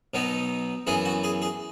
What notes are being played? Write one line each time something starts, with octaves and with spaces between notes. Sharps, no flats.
B2 F#3 B3 D#4
F#2 E3 B3 E4 G#4
F#4
G#4
G#4